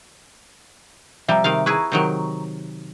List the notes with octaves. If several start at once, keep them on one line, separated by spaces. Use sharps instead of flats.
C3 F3 G3 E5 A#5
C3 D#3 F5
E4 G#4 B4 A#5 C#6
C3 D#3 F#3